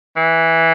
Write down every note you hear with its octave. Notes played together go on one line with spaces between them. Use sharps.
E3